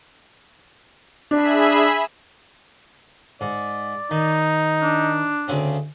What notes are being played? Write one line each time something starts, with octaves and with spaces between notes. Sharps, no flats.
D4 G#4 E5 B5
G#2 D5
D#3 D#4
D4
D2 C#3 C4